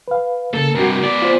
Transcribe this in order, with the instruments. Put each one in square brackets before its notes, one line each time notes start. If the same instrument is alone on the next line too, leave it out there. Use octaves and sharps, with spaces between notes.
[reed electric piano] B4 F5
[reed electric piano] C#3 A#3 [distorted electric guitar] A4
[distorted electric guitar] G2 C3 [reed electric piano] F#4 A#4
[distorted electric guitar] B3 D5
[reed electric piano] F4 C5